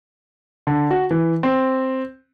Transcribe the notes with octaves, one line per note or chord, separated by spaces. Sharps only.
D3
F#4
E3
C4